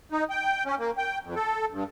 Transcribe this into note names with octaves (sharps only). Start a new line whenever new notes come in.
D#4
G5
C#4
A#3
G5
F2
A4
G2